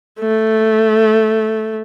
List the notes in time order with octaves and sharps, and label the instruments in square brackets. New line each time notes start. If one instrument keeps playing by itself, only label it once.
[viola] A3